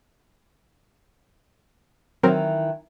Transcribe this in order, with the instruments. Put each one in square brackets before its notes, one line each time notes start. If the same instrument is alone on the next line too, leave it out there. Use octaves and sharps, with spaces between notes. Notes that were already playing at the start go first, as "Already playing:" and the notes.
[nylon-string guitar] D#3 E3 [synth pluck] F#3 C4 A#4